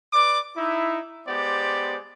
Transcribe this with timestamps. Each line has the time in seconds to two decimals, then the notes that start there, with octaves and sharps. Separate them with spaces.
0.12 B4 D5 D6
0.57 D#4 E4
1.28 G#3 B3 G4 C5 D5